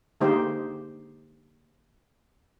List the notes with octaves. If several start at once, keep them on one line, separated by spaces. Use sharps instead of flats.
D3 G#3 A#3 D#4 G4 C5